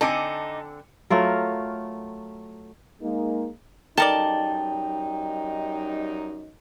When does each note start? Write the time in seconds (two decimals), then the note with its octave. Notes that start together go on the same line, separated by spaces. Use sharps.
0.01 D3 C4 D#4 G#5 A5 D6 C#7
1.10 F#3 A3 F4 A#4
3.01 G#3 A#3 D#4
3.97 F#2 G3 D#4 A4 A#4 D5 G5 A5